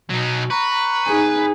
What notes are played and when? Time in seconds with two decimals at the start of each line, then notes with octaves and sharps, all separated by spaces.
0.10 B2 F#3 D#4
0.50 B4 A#5 C#6
1.08 D#4 G#4